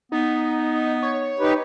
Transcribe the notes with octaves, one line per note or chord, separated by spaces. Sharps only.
B3 D#4
C#5
D#4 G4 B4